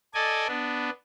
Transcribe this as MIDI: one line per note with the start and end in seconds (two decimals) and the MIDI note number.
0.14 0.47 69
0.14 0.47 74
0.14 0.47 75
0.14 0.47 80
0.48 0.90 59
0.48 0.90 62